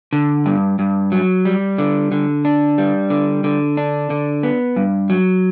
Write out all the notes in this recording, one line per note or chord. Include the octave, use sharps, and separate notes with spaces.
D3
G2
G2
F#3
G3
D3
D3
D4
G3
D3
D3
D4
D3
B3
G2
F#3